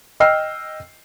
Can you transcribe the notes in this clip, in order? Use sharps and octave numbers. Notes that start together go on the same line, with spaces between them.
D#5 G5 E6 F6 C7